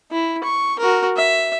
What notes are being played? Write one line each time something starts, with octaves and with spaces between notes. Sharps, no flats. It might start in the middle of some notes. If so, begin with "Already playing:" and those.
E4
C#6
F#4 A#4
E5